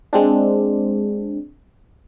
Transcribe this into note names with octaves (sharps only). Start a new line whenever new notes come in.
G#3 C4 D4